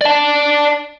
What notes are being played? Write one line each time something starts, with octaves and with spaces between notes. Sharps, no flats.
D5 A5